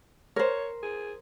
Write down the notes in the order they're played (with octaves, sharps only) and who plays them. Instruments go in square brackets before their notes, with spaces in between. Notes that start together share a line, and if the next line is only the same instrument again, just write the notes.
[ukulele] A#4 C5 [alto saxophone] C#5
[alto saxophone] G#4